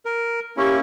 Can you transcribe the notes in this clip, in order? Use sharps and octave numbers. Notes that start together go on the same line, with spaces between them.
A#4
A#3 C#4 E4 G4 C#6